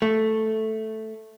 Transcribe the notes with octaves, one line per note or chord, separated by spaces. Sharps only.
A3